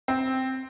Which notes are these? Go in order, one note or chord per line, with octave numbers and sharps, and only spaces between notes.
C4